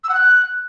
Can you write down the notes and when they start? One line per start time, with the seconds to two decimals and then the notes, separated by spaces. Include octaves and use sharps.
0.04 E6
0.09 F#5
0.15 F#6